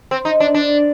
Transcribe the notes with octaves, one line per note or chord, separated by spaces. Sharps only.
C4
D#4
D4
D4